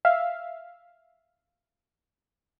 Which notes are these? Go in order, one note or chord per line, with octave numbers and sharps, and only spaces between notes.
E5 F5